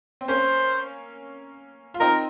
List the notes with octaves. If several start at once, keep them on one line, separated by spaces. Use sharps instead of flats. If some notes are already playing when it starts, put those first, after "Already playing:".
C4
A#3 C#4 C5
F4
C4 D#4 A#4